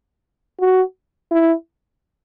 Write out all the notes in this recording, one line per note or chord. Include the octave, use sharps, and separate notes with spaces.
F#4
E4